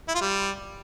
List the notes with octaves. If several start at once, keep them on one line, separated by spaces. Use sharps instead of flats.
E4
F4
G3